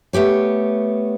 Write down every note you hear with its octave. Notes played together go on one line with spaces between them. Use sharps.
A3 B3 G4 C#5